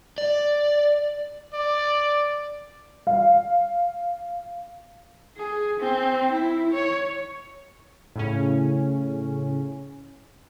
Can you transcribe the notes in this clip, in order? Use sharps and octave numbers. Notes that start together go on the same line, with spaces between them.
D5
D5
F5
G#4
C4
E4
C#5
A2 C#3 C#4